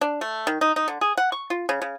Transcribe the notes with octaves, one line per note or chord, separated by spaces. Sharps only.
D4
A3
D#3
D#4
D#4
D3
G#4
F#5
C#6
F4
C#3
C#3